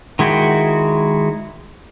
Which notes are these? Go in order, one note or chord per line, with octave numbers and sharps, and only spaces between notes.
D#3 G#3 E4 F#4 G5